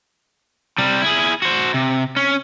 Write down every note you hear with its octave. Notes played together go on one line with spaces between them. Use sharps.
C3 G3
E4 G#4
F#4 C5
C3
C#4